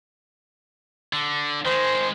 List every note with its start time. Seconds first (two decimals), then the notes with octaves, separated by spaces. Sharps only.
1.13 D3
1.65 D#3 G#3 C5